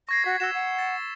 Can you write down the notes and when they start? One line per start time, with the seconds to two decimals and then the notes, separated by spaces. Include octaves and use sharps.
0.09 C#6 G#6 A#6 C7
0.25 F#4 B6
0.40 F#4 E6 G#6 E7
0.54 F#5
0.79 A6